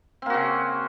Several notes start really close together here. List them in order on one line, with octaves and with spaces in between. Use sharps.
C4 A#3 F#4 C#3